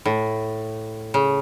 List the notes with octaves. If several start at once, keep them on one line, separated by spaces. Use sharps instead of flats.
A2
C#3